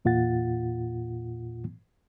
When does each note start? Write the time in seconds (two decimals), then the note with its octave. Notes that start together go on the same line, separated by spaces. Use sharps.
0.05 E2 A#2 F4 F#5 A6